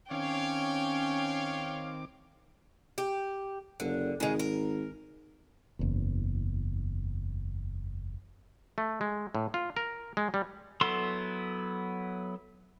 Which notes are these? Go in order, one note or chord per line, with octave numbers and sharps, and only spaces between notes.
D#3 C4 C#4 C#5 F5 G5 D6
G4
F#1 D3
G#1 C#3 G#3
A#4
F#1 E2
A3
G#3
A2
F4
A#4
G#3
G3
F#3 B3 E4 A4 C6